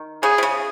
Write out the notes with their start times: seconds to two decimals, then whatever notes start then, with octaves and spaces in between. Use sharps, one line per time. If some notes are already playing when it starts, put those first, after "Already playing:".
Already playing: D#3
0.23 C#3 G#4
0.38 C3
0.43 C#3